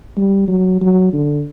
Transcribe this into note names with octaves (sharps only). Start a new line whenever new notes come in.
G3
F#3
F#3
D3